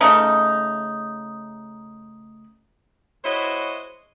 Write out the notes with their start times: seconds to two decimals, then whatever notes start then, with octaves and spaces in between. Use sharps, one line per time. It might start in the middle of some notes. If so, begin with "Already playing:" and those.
0.01 C#3 A3 D#4
3.25 G#3 E4 F#4 C5 C#5 D#5